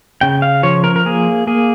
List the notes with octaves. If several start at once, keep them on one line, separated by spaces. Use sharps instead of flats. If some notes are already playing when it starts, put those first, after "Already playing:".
C#3 G5
F5
F3 C#5
A#4
A#4
A#3 G#4
A#3 G#4